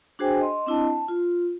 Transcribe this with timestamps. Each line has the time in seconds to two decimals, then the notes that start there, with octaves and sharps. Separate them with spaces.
0.19 D4 F#4 G#4 C5 G5 G#5
0.40 D#5 C6
0.66 C4 D4 E4 D#5 A5
0.84 A5
1.08 F4